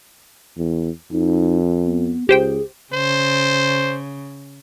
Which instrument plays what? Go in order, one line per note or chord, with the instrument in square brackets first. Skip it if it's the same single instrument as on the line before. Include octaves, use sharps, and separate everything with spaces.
[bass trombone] E2
[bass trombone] F2 [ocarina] D#4
[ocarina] B3
[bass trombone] C#2 [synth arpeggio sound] G4 C5 G5 [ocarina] G#4
[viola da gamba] C#3 [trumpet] C5